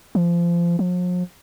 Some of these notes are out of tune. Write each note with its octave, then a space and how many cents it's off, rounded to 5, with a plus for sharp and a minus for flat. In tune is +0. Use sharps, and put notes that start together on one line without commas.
F3 -25
F3 +45